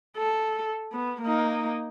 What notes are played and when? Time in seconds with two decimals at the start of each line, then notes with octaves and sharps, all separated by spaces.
0.17 A4
0.92 B3
1.22 A#3 D#4